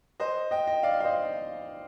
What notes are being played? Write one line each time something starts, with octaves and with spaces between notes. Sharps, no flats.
C5 D#5
D#5 G5
D#5 G5
D5 F5
F5
C5 D#5